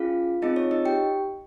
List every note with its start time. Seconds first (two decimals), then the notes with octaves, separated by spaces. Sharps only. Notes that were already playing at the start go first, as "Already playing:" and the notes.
Already playing: C#4 F4 G#4 F5
0.42 C4 D#4 F4 G#4 D#5
0.56 C#5
0.71 D#4 D#5
0.85 G4 G5